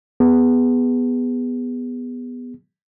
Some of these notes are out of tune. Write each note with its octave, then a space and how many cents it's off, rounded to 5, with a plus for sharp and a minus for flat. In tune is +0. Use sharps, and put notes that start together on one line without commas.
B3 +0 G#4 -25